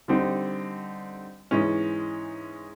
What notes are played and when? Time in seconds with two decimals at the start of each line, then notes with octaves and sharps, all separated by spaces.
0.08 D3 G3 C4 D#4
1.51 G#2 E3 G#3 C#4